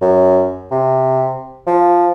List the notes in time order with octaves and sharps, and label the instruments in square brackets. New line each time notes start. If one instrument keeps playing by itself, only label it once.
[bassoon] F#2
C3
F3